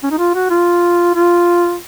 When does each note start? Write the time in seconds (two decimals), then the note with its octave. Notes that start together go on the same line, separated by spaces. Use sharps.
0.03 C#4
0.11 D#4
0.18 F4
0.35 F#4
0.50 F4
1.15 F4